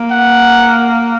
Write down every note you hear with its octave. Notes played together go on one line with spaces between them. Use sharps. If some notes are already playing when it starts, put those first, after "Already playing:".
Already playing: A#3
F#5